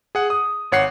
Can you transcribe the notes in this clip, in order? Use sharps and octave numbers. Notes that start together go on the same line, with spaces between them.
G#4 F#5
D#6
G#1 C#5 F#5 C7